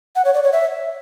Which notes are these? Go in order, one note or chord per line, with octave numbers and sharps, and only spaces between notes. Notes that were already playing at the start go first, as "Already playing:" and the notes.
F#5
C#5
D5
C#5
E5